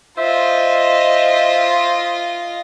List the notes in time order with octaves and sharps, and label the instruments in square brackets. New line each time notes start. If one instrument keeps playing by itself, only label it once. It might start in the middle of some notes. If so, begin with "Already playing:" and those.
[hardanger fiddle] F4 D#5 [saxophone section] C5 E5